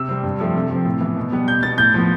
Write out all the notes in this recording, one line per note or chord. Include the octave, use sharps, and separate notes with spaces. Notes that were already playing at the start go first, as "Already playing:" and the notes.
Already playing: C3 E6
G3 C4
G2
F3 A3 C4
C3
F3 C4
A2
E3 B3
B2
G3 B3
B2 G6
B3 A6
A2 G6
F3 B3